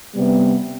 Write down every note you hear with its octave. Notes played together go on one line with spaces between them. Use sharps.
C3 G3 B3